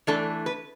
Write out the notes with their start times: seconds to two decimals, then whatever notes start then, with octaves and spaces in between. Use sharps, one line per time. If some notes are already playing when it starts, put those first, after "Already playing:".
0.07 E3 A3 D4 A4
0.46 B4